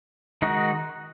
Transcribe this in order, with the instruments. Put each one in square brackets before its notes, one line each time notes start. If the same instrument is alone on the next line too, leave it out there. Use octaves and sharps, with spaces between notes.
[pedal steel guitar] D#3 G#3 D#4 F#4